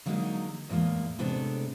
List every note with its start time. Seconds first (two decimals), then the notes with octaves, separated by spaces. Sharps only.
0.06 D3 F#3 G#3 A#3 C4 D#4
0.69 E2 A2 G#3 A#3
1.19 A2 C3 G#3 B3 D4 A4